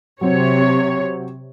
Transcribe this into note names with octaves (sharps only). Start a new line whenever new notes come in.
C3 F#3 C4 C#5